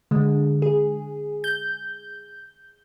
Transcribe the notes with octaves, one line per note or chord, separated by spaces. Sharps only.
D3 G#3
G#4
G6